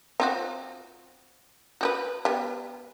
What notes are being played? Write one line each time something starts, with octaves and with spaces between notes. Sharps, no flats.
C4 F4 F#4
F#4 G4 B4
G3 B3